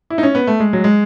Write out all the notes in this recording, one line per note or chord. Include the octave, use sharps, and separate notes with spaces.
E4
D#4
C#4
B3
A3
G#3
F#3
G#3